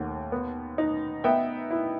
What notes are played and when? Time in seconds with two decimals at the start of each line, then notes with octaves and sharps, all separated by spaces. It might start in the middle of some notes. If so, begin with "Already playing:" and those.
Already playing: D#2 A3 F#5
0.32 B3
0.78 D#4
1.24 B3 E5 G5
1.70 E4